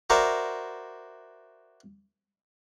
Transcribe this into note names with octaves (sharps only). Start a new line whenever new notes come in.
F#4 A#4 C5 D5 E5